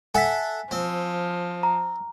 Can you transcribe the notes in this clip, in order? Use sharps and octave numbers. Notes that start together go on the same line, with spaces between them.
A4 E5 F#5 G#5 B6
F3 C4
A#5